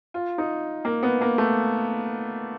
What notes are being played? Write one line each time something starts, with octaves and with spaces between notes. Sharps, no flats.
F4
D#4
A#3
B3
A#3
A3